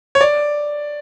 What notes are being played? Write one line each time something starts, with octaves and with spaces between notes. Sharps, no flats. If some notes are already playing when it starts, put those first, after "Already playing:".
C#5
D5